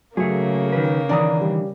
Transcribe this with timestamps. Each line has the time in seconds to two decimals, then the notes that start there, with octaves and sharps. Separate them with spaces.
0.17 C#3 F#3 A3 A#3 G#4
0.72 D#3 B4
1.09 D#3 E3 D4 D5 A#5 D#6
1.41 G3